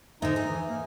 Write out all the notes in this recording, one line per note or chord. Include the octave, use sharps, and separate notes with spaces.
G#2 D3 D#4 E5
G#4
E3
A#3